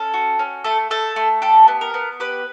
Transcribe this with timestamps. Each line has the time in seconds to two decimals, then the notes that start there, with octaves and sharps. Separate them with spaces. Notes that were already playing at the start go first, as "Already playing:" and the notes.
Already playing: C#4 A4
0.14 F#4
0.39 C#4
0.64 A3 A4
0.91 A3 A4
1.16 A3
1.42 G4 A4
1.68 B3
1.81 A#4
1.94 B3
2.20 G4 B4